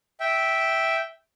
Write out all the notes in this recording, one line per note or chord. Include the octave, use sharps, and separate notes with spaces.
E5 G5